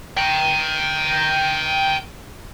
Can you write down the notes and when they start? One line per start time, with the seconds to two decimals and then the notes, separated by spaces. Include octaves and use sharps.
0.17 G5 A#5